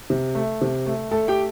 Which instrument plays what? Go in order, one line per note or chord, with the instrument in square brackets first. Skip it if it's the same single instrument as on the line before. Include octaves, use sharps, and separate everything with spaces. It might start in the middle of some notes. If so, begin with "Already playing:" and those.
[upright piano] C3
A3
C3
A3
A3 A4 A5
G4 G5